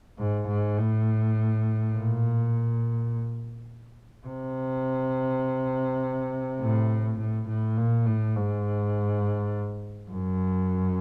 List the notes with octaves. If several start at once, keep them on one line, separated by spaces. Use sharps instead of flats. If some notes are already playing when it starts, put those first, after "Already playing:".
G#2
G#2
A2
A#2
C3
A2
A2
A2
A#2
A2
G#2
F#2